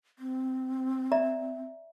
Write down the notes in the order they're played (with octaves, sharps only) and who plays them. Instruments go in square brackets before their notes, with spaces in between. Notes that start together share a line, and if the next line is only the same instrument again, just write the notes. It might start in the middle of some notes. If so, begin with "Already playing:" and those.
[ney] C4
[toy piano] D5 E5 A#5